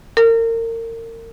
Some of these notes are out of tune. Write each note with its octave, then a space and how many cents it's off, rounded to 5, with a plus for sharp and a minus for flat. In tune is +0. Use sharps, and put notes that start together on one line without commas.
A#4 -30